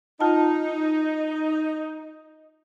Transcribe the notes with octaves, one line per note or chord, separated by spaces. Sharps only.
D#4 F4 F#5 A5